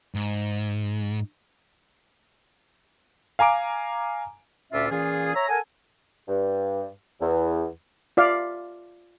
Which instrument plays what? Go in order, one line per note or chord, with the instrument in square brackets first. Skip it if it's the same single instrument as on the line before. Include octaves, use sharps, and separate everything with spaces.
[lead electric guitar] G#2
[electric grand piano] F5 G#5 A#5 D6 D7
[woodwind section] D2 A#2 C#4 F4 D5 E5
A#2 E3 C#4 F4 G#4
C#5 E5 A#5
A4 A#4 F#5 G#5
G2
E2
[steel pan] F4 D5 E5 F5